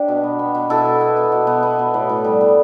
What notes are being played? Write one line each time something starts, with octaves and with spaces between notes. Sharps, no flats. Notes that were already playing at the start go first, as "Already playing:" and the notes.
Already playing: D4 G4
B2
B3
B3
B2
B2 E4 A4
B3
B3
B2
B2
B3
B3
B2
A2
A2
G3
B3